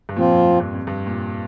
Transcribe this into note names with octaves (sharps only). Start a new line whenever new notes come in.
G2
A#2 F3 C4 F4
F2
A#2
G2
F2
G2
A#2